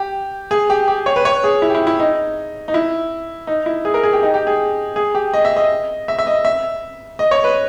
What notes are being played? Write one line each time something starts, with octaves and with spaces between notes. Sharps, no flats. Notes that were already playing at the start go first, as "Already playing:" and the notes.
Already playing: G4
G#4
G4
G4
C#5
B4
C#5
G#4
E4
G4
E4
E4
D#4
D#4
E4
D#4
E4
G#4
A#4
G#4
G4
D#4
G4
G#4
G#4
G4
D#5
E5
D#5
E5
E5
D#5
E5
D#5
C#5
B4